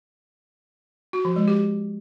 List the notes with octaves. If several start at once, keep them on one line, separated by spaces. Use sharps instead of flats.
F#4
F3
G#3
G4